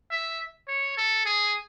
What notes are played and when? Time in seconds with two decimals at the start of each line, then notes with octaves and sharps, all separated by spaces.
0.11 E5
0.68 C#5
0.97 A4
1.25 G#4